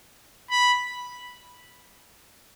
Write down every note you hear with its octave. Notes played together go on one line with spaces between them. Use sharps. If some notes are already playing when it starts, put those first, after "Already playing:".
B5